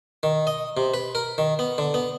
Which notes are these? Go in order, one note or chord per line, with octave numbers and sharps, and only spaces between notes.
D#3
D#5
C3
B4
A#4
D#3
B3
D3
B3